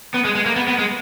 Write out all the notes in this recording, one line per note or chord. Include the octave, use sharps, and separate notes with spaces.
B3
G#3
G#3
A#3
B3
B3
G#3